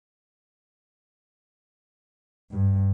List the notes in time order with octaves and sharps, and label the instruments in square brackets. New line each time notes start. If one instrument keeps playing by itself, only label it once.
[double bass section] G2